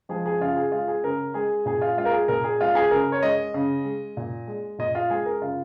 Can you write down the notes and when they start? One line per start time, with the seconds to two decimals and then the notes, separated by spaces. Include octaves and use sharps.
0.09 F3 G#3 G#4
0.26 G#4
0.40 C#3 F4
0.56 G#4
0.72 G#3 F4
0.88 G#4
1.03 C#3 A#4
1.34 G#3 G#4
1.66 A#2 G#4
1.81 F4
1.97 G#3 F4
2.05 A#4
2.12 G#4
2.28 A#2 A#4
2.44 G#4
2.61 G#3 F4
2.75 G#4
2.91 C#3 A#4
3.12 C#5
3.23 G#3 D#5
3.54 C#3
3.85 G#3
4.17 A#2
4.47 G#3
4.79 A#2 D#5
4.95 F4
5.10 G#3 G#4
5.26 A#4
5.41 C#3 F4